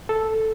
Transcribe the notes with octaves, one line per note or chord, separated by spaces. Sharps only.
A4